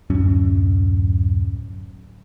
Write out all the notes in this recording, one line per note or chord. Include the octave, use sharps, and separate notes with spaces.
D1 F#2 C#4